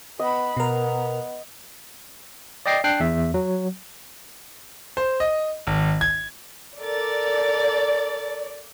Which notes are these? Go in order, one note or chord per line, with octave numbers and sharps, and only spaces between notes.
B3 D#5 B5
B2 B3 A#4
D5 D#5 G5 A#6 C7
D4 G5 F#6 C7
E2 E5
F#3
C5
D#5
G#1
G#6
A4 A#4 D5 A6